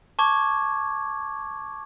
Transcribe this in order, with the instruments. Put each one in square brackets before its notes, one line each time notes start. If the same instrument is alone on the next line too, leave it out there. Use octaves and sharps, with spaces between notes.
[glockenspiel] A5 C#6 D6 G#6